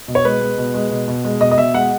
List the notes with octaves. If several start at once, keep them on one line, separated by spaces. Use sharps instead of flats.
B2
C#5
G#3 B4
G#3
B2
G#3
B2
B2
G#3
B2 D#5
D#5
B2 E5
G#3 F#5